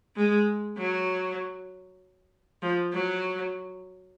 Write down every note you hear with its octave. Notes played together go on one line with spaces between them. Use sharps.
G#3
F#3
F3
F#3